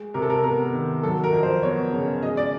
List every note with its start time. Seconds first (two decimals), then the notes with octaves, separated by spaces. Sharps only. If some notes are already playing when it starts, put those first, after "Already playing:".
Already playing: G#3
0.14 C3 A#4
0.22 A4
0.30 A#4
0.44 B3 A#4
0.73 D#3
1.03 F#3 A4
1.24 A#4
1.33 F2
1.43 C5
1.63 B3 C#5
1.92 C#3
2.23 G#3 D#5
2.37 D5